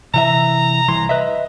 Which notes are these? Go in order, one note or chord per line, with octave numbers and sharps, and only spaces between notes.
C3 E3 E5 A#5
C2 E3 C6
B4 D#5 E5